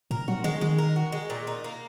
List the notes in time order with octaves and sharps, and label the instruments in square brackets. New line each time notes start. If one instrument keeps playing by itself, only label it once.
[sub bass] A#2 [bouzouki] A#4
[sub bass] F#3 [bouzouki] F#4
[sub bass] D#3 [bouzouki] G#3
[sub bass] D#3 [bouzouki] G#3
[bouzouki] A#4
F#4
G#3
A#2
D#4
A#3